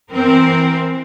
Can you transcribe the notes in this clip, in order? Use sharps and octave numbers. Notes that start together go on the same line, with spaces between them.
E3 C4 A#4 C5